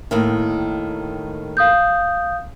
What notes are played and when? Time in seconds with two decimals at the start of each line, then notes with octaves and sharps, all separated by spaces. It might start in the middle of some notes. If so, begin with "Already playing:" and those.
0.11 D#2 A2 D#3
1.57 F5 D#6 G6